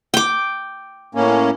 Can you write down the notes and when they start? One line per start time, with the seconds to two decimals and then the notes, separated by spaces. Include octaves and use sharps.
0.14 G5 D6
1.15 A2 A#3 C#4